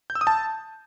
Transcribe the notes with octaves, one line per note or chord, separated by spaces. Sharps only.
G6
E6
D#6
A5